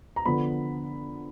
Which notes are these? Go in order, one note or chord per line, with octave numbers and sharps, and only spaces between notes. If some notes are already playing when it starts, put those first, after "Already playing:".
A#5
D3 F3 B3 B5